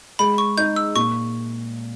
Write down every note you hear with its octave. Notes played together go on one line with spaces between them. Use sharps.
G#3 B5
C#6
D#4 G6
E6
A#2 C#6